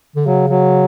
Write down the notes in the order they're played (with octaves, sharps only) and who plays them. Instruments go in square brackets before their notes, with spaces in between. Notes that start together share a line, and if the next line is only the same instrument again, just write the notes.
[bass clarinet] D3
[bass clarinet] C#3 [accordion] F#3
[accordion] F#3